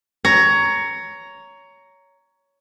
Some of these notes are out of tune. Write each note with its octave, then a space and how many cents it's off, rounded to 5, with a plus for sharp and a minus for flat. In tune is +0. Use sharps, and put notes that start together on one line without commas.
C#5 +15 A#5 +0